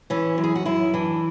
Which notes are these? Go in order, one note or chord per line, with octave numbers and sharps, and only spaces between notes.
E3 C#4
F#2
G#4
F#4
F#2 E4
E3 D4